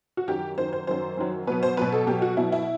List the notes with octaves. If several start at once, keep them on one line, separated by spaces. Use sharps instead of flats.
F#4
F#2 D#3 F#3 G4
F#2 D#3 F#3 C5
C5
F#2 D#3 F#3 C5
F#2 D#3 F#3
B2 F#3 B3 B4
C5
B2 F#3 B3 B4
A4
B2 F#3 B3 G4
F#4
B2 F#3 B3 E4
E4